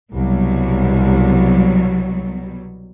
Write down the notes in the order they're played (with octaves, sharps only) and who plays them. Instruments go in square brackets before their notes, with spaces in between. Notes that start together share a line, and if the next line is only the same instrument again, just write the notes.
[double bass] C2 [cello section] B2 F#3 G3